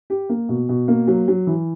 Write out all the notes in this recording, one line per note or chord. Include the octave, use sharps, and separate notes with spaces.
G4
A#3
B2
B2
A#3
F#3
F#3
E3